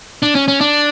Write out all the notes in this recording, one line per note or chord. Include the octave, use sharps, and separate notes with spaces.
D4
C#4
C#4
D4